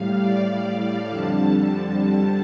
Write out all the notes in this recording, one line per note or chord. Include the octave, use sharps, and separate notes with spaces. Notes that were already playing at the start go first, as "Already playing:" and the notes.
Already playing: A2 G3 F5
D5
F5
F2 D3 G3 A5
A5